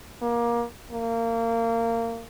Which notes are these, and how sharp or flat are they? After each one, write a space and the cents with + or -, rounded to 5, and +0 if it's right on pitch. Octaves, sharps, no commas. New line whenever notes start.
A#3 +20
A#3 -25